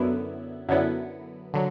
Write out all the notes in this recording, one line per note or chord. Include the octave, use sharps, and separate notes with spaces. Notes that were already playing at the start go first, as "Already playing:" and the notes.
Already playing: F#2 D3 F#3 B3 E4
F#2 D3 F#3 B3 E4
D3 F#3